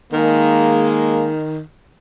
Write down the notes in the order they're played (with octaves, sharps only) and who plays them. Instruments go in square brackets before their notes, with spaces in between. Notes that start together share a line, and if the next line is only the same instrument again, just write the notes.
[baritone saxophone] D#3 [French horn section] G#3 A#3